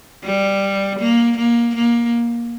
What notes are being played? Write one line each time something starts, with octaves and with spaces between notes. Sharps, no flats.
G3
A#3
A#3
A#3